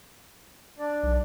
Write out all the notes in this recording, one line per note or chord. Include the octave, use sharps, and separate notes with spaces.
D4 D5
B1